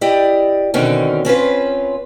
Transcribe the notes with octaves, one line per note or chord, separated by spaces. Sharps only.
E4 G4 D5 D#5
B2 D3 D#3 C4 C#4
C4 C#4 F4 B4